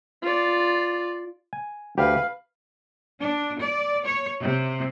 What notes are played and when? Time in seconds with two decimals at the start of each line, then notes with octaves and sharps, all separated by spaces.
0.22 F4 D5
1.53 G#5
1.98 D2 G4 B4 F5
3.20 D4
3.59 D5
4.05 C#5
4.41 C3